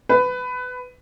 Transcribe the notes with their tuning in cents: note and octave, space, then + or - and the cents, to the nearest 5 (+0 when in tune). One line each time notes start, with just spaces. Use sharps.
B4 +20